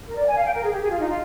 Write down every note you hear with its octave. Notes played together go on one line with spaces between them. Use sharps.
A#4
D5
G#5
F5
G5
A#4
G#4
G4
G#4
F4
D#4
F4